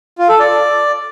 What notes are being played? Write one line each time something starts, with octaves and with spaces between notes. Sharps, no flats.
F4
A4
D5